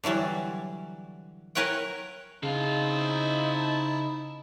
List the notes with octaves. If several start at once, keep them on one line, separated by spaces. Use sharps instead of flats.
D3 E3 F#3 G3
A#4 B4 C#5 F#5 G5
C#3 C4 D#4 E4 D#5 F5 A5